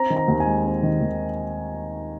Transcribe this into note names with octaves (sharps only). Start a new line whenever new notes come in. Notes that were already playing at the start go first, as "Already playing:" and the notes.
Already playing: C4 A#5
D#3
A#5
D#2
G#5
G#3
C4
D#3
D#2